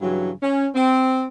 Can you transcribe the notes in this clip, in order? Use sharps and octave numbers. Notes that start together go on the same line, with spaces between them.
G2 C#3 E3 F#3
C#4
C4